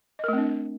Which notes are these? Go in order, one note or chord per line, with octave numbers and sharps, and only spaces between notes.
A3 C4 D4 A#4 D#5